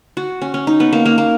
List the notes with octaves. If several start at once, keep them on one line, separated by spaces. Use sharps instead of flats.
F#4
C#4
C#4
D#4
B3
A#3
A#3
A#3